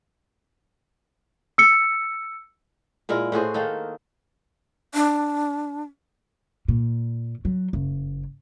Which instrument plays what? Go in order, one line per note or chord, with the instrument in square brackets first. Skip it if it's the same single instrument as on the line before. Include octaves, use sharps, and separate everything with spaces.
[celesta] E6 C#7
[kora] A#2 G#3 E4 A#4
A2 F#4 G#4 C5
D#3 A#3 D#4 A4
[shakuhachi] D4
[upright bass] A#2
F#3
F#1